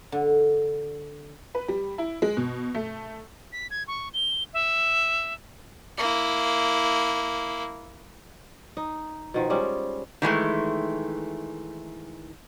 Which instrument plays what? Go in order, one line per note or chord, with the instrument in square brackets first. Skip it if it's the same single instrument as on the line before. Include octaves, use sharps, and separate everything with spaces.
[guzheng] D3
[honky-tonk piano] B4
G3
E4
G#3
B2
A3
[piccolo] B6
G#6
C#6
G7
E5
[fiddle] A#3 E4
[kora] D#4
B2 D#3 F3
F3 G3 G#3 C#4
[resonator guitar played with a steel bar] D#3 E3 G#3 A3